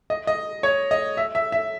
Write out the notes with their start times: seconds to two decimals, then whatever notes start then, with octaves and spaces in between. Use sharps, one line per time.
0.10 D#5
0.27 D#5
0.63 C#5
0.91 D#5
1.17 E5
1.35 E5
1.52 E5